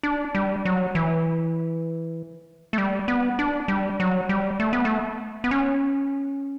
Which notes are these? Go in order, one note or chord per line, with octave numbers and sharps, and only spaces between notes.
D4
G3
F#3
E3
A3
G3
B3
D4
G3
F#3
G3
A3
B3
A3
B3
C#4